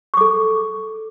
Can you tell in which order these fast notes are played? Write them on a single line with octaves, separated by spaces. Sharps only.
C#6 D6 A4